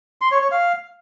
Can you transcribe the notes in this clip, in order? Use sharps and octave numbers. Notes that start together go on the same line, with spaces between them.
C6
C#5
C#5
F5